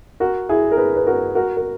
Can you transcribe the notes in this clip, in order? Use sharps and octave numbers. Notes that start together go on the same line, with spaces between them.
F#4 A#4
E4 G#4
A#4
G#4 B4
B4
F#4 A#4
F#4 A#4
A#4